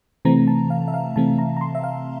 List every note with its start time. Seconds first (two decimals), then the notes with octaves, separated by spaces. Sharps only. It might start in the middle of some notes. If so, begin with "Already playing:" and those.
0.25 C3 E3 A3 C4 A#5
0.47 A5
0.70 F5
0.88 E5
0.94 F5
1.16 C3 E3 A3 C4 A5
1.38 A#5
1.57 A#5
1.61 C6
1.75 E5
1.84 F5